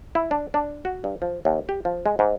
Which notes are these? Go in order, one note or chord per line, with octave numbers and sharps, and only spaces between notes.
E4
D4
D4
F#4
G2
F3
D#2
G4
F3
G#3
G#2